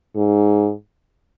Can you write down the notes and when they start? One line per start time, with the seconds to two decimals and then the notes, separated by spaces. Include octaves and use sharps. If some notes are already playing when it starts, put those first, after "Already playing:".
0.16 G#2